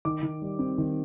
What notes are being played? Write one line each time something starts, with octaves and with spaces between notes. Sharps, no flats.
D#3 D6
D#3
G3
C4
D#3